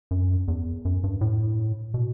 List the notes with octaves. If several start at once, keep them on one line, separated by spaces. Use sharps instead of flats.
F#2
E2
F#2
G2
A2
B2